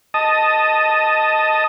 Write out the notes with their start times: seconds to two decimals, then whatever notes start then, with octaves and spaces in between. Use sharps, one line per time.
0.14 D#5 A5 D#6